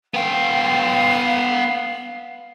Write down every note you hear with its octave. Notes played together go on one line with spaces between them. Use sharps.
B3 F5 G5